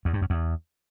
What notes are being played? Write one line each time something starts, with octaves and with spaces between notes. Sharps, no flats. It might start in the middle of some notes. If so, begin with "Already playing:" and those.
E2
G2
F#2
E2